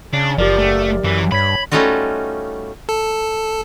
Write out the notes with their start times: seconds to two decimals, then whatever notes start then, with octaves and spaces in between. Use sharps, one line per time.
0.13 C#3 D4
0.38 F#1 F3 G4 A#4 D5
0.58 A3
1.04 F#2 E3
1.32 G2 C#5 B5 G#6 B6
1.72 G3 A3 C#4 D#4 F4 F#4
2.89 A4